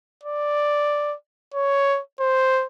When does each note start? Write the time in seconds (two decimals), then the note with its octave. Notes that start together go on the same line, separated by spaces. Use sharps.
0.23 D5
1.54 C#5
2.20 C5